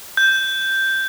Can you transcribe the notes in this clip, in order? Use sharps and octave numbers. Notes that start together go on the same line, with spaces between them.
G6